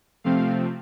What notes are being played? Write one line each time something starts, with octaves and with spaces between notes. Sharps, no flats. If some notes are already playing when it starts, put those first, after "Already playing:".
C3 F3 A3 C4 F5